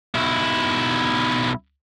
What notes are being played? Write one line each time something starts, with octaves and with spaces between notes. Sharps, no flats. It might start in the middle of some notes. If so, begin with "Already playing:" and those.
B1 E4